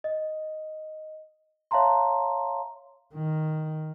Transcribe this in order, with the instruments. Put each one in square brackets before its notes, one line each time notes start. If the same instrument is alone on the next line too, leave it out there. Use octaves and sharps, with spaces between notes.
[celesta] D#5
C#5 E5 F5 A5 A#5 C6
[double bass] D#3